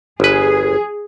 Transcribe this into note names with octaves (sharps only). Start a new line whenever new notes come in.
G1 G#4 B4